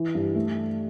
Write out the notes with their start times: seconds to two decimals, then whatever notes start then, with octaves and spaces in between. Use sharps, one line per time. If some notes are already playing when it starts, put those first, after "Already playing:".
Already playing: E3
0.15 G2
0.35 A3